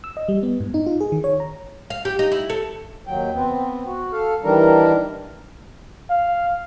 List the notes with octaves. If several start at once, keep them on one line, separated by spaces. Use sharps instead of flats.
E6
D#5
G3
B3
G#2
D#4
F4
G#4
D#3
C#5
A#5
F5
G4
D#4
E4
A4
D#2 F#3 G5
B3 C4
F#4
A4 F5
D#3 E3 G3 D4 A#4
F5